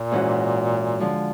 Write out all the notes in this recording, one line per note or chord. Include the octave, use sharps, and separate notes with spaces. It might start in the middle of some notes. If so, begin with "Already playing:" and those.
Already playing: A#2
G#2 E3 G#3 C#4 F#4
D3 F3 G#3